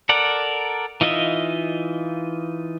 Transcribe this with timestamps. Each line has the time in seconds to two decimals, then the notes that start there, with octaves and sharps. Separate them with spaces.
0.09 A4 A#4 D5 F#5
1.01 E3 D#4 F4 D#5 E5